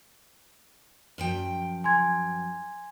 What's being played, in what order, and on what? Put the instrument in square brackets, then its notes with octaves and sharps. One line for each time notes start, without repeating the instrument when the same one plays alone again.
[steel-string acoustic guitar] F#2 F3 G5
[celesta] G#5 C6 G#6